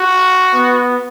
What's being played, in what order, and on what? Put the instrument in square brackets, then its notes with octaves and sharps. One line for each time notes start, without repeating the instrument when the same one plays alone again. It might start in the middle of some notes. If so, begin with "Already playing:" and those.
Already playing: [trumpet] F#4
[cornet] B3